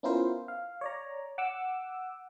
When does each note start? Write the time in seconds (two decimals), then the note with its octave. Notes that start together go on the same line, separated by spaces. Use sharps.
0.03 B3 C#4 E4 F4 A#4 C5
0.48 F5
0.81 C#5 D5 A#5
1.38 F#5 D6 E6